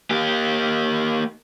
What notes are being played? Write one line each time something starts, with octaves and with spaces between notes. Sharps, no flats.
A#3 G4